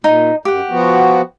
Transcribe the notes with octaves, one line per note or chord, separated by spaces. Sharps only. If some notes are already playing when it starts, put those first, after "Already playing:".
A#2 D#4
F#2 G4 F#5
F3 B3 F#4